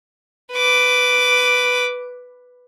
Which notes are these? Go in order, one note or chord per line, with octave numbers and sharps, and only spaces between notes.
B4 D6